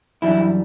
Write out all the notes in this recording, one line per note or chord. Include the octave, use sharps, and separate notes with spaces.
F#2 E3 G3 D4 E4